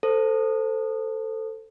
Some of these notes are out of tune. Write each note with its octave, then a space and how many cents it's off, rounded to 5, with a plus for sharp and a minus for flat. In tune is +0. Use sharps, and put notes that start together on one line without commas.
A4 +15 C5 -10